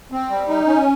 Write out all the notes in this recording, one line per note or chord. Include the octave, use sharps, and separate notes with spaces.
C4
G3
D#4
C#4